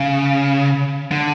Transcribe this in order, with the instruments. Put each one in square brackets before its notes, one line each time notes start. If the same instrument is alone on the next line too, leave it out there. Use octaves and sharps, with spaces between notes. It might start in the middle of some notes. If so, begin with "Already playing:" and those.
Already playing: [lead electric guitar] C#3
D3